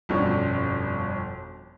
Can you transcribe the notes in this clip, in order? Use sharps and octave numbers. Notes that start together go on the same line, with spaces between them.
G1 F2 B2 C#4 D4 C#5